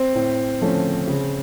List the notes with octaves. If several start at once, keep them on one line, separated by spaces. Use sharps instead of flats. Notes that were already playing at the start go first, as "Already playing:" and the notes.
Already playing: C4
A2
F3 A3 C#4
C#3